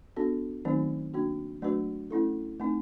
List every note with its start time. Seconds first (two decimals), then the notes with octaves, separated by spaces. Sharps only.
0.16 B3 D4 F#4 A4
0.65 D#3 F#3 A3 C4 D#4
1.14 A#3 D4 F#4
1.62 F#3 A3 D4 F#4 B4
2.11 A3 C#4 E4 A4
2.60 A3 C4 D#4